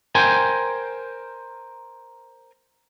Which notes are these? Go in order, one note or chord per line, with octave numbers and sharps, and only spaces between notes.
A#4 C5 G5 G#5